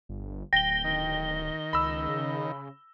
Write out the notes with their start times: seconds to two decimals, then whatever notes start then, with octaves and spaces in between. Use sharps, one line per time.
0.09 G1
0.53 D1 G5 A#6 G7
0.84 D#3
1.73 C#2 B5 E6
2.08 C#3